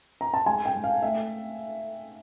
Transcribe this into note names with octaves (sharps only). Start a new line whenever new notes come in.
A#5
A5
G#3 G#5
G5
G#3
F5
A3 E5